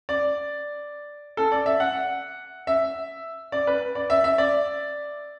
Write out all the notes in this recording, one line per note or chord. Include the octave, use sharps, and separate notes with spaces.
D5
A4
D5
E5
F#5
E5
D5
B4
D5
E5
E5
D5